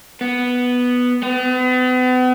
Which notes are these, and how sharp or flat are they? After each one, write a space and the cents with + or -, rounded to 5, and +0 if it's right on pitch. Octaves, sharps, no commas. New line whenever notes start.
B3 +0
B3 +40